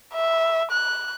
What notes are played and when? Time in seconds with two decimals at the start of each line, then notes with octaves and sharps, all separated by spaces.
0.13 E5
0.72 F#6